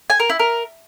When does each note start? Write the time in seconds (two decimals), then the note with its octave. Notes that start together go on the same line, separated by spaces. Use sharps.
0.10 G#5
0.20 A#4
0.29 E4
0.39 A#4